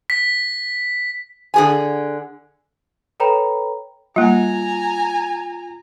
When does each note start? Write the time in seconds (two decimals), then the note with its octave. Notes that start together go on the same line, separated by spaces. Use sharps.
0.10 B6
1.54 D3 G#4 G#5
3.20 A4 B4 C#5 G5 A#5 B5
4.16 G3 A#3 F4 G#5 A#5